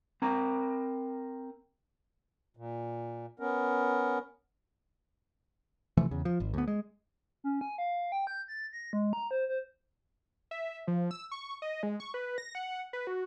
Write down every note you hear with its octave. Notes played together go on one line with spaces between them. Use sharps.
C4 A#4 A#5
A#2
B3 C#4 A#4
C3 E3 F3 A3
E2 C#3
F3
G#1
D2 B3
G#3
C#4
G#5
F5
G5
G6
A6
A#6
G#3
A#5
C5
C5
E5
F3
E6
C#6
D#5
G#3
C#6
B4
A#6
F#5
B4
F#4